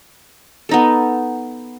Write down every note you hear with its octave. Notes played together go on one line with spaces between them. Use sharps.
B3 D#4 A4